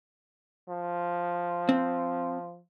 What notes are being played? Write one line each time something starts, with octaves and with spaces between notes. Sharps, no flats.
F3
C4